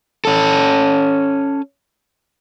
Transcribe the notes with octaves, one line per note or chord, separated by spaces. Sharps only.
C#4 A4